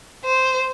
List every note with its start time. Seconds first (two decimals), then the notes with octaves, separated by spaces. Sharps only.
0.25 C5